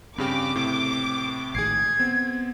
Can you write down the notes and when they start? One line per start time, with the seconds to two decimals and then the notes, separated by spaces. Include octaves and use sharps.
0.18 G2 C#3 C4 G4 D6
0.55 A2 C3
1.55 A#1 A2 D#3 G#4 G#6 C7
1.99 B3 C4